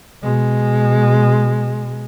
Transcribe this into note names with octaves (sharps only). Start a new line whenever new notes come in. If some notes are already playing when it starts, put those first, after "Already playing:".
B2 G#3